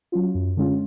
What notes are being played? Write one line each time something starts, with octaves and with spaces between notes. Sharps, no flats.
F#3 C#4 F4
F#2
D3 G#3 C#4 F4